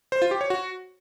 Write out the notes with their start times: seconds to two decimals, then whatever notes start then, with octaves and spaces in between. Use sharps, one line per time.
0.12 C5
0.22 F4
0.31 G4
0.41 C#5
0.50 F#4